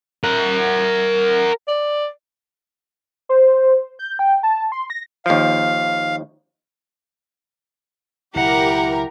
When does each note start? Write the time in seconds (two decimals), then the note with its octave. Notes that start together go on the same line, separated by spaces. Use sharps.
0.24 A#4 F#5
1.68 D5
3.29 C5
3.99 G6
4.19 G5
4.43 A5
4.72 C6
4.90 A#6
5.26 D#2 F3 F5
8.35 C#2 B2 F#3 E4 G4 A#4 F#5